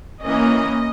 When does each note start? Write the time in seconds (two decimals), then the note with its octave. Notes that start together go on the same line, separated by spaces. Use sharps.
0.22 E3 A#3 C#4 D#5